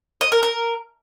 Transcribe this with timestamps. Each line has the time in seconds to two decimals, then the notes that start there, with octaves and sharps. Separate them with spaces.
0.21 D#5
0.32 A#4
0.43 A#4